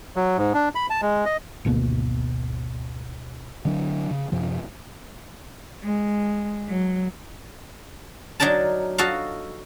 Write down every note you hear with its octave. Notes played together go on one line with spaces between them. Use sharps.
F#3
G#2
D4
B5
A5
G#3
D#5
G#1 D2 B2 A#3
D3 F#3 D4
C#3
F#2 C3 F3
G#3
F#3
F#3 D4 D#4 A#4 A5
F#4 A4 D#5 F5